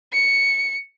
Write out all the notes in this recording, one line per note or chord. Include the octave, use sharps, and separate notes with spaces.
C#7